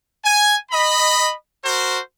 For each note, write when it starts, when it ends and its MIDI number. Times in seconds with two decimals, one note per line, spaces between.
0.24 0.56 80
0.71 1.33 75
0.71 1.33 83
1.63 1.99 66
1.63 1.99 70
1.63 1.99 72